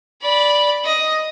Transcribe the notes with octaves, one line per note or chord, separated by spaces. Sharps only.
D5 B5
D#5